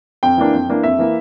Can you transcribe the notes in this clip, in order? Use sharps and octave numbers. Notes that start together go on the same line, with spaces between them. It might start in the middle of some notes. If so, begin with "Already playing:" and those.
F2 G5
E3 A#3 D4
F2
E3 A#3 D4
F2 E5
E3 A#3